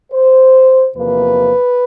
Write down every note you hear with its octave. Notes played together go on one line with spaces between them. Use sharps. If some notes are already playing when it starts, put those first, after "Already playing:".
C5
E2 C3 F3 A#3 B4